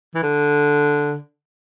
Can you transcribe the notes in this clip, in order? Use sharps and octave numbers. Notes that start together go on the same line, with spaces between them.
E3
D3